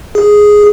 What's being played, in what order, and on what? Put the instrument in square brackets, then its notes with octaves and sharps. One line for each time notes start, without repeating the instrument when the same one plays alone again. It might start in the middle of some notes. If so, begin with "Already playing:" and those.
[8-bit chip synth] G#4